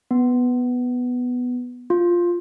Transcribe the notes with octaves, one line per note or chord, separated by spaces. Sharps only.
B3
F4